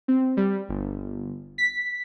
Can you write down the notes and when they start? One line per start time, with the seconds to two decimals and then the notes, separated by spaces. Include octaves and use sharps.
0.08 C4
0.37 G3
0.69 G1
1.58 B6